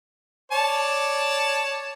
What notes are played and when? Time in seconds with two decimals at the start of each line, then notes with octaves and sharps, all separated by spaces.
0.52 C#5 D5 A5